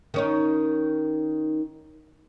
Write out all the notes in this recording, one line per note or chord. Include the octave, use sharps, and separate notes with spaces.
D#3 C#4 D#4